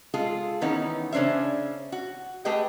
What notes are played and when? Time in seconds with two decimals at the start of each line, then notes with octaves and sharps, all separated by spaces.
0.14 G#3 F4 G#4 A4
0.61 D#3 E3 B3 C#4 D#4
1.12 C#3 C#4 D4 C5 E5
1.92 F#4
2.45 A3 G4 G#4 B4 D#5 G5